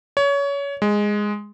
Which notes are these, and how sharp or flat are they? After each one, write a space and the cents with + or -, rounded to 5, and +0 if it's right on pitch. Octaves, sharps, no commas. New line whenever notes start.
C#5 +25
G#3 -5